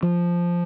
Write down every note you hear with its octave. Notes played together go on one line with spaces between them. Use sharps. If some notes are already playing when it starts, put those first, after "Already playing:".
F3